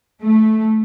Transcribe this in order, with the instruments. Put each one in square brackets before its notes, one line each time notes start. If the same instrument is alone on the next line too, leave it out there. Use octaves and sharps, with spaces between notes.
[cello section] A3